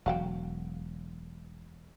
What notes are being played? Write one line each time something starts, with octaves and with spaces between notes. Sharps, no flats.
E1 F#3 F#4 F5 G5